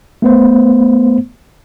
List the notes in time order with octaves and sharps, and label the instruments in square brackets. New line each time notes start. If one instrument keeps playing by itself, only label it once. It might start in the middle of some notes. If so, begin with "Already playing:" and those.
[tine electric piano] A3 B3 C5